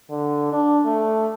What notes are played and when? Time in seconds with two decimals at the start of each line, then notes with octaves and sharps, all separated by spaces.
0.10 D3
0.52 D4
0.85 A3